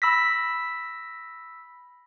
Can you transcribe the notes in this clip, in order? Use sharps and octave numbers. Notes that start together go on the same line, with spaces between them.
B5 E6 A#6 B6